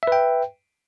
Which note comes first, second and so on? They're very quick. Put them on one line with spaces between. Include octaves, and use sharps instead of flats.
E5 B4 G5